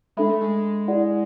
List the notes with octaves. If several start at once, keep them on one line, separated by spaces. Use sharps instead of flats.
G#3 D4 A4 E5 B5
A3
G#3
E4 G#4 D5 F#5